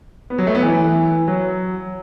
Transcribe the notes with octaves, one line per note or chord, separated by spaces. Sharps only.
B3
F#3
A3
B3
E3
F#3